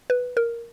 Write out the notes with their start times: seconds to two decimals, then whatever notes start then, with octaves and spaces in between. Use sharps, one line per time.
0.10 B4
0.37 A#4